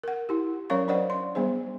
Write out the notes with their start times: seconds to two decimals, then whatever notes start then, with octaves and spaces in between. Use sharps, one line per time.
0.04 A#4 F#5
0.29 E4 G4
0.70 F#3 C#4 A#4 C#5 F5 C#6
0.88 D4 C5 D5 D#5 F#5
1.10 C6
1.35 G3 B3 D4 G#4 C5